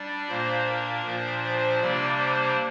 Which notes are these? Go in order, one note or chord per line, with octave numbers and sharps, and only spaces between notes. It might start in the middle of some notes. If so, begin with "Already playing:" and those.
Already playing: G3 D4 D5
A#2 A#3 D4 C5
A#4
A#2 F3 D4 C5
C5
C3 G3 A#3 D4 D5
C5